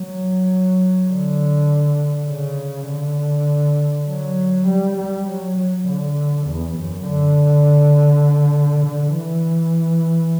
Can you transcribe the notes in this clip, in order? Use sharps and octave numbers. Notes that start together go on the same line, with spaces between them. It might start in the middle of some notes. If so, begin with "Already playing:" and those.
Already playing: F#3
D3
C#3
D3
F#3
G3
G3
F#3
F#3
D3
E2
F#2
D3
D3
E3